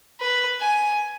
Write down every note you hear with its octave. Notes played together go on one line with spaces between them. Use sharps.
B4
G#5